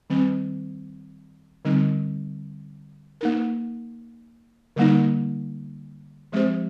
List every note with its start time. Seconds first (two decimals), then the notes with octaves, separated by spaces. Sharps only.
0.10 D#3 G3 C4
1.65 D3 G3 C4 D#4
3.21 A#3 D#4 A#4
4.76 D3 G3 A#3 D#4
6.32 F3 G#3 C4 G4 C5